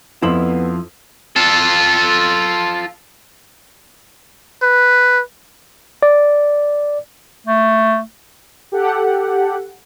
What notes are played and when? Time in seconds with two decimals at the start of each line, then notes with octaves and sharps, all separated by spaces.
0.22 F2 F3 B3 E4 C6 F#7
1.36 F4 A4
4.62 B4
6.03 D5
7.47 A3
8.72 G4 A4 F#5